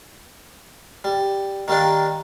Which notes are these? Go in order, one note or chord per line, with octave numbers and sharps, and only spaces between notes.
G3
D#3 G3 A#3 D4